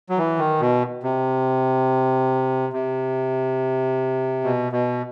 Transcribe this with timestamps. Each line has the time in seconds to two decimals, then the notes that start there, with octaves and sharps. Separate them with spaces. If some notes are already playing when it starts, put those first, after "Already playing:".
0.09 F#3
0.18 E3
0.39 D#3
0.61 B2
1.03 C3
2.73 C3
4.44 B2
4.72 B2